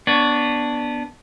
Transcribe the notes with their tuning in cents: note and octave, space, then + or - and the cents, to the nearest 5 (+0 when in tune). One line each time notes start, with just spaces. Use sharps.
B3 -10 D4 +0 C#5 +15